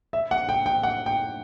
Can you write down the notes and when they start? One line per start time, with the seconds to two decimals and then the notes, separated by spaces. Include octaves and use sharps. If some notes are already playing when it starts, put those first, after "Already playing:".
0.13 E5
0.31 F#5
0.49 G5
0.66 G5
0.83 F#5
1.06 G5